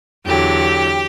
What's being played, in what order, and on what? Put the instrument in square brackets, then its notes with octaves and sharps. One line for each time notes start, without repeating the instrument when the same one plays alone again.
[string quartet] E2 D3 F#3 G4